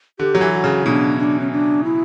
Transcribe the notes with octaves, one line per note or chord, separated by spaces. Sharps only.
D3 G4
F#3
E3
F#4
C#3
B2 D4 E4
D4
C#4
D4
E4